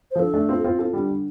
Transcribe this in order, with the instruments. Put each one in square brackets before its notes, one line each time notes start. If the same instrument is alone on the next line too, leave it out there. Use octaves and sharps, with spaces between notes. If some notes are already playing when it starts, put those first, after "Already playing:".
[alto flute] C5
[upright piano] F3
[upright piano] D3 [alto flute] A4
[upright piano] A3 D4
C4 F4
C4 F4
F4 A4
D3 G3
D3